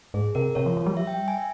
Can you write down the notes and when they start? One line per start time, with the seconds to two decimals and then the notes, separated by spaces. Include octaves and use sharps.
0.14 G#2 G#4
0.35 C3 A#4
0.55 C3 C#5
0.66 F3
0.77 F3
0.86 G3
0.92 F3
0.97 G3 E5
1.07 G5
1.28 G#5
1.38 E5